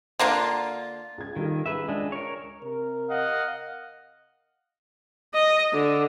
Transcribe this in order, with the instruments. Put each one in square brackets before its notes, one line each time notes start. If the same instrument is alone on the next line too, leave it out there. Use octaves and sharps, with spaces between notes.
[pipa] D3 A#3 D4 F4
[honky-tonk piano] C#2 G#6
[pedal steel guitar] D#3 [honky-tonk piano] G3 F4 A4
[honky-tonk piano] C#2 [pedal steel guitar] B4 E5
[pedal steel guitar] G#3 D4
A#4 C#5
[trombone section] C3 A#4
[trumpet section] D#5 F5 F#5
[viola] D#5
D3